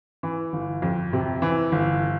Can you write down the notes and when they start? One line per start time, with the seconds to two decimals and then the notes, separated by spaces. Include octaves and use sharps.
0.23 E3
0.53 G1
0.82 F2
1.13 C3
1.42 E3
1.72 G1